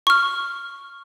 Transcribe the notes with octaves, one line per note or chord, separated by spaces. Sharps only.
C#6 F6